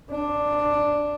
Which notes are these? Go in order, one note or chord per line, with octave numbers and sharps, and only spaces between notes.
D4